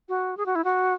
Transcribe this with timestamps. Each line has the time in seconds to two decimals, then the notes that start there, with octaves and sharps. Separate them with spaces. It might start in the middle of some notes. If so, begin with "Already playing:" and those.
0.09 F#4
0.37 G#4
0.46 F#4
0.55 E4
0.64 F#4